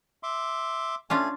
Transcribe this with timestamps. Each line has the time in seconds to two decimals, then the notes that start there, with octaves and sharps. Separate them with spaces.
0.23 E5 C6 D6
1.10 A3 C#4 D4 F4 G#5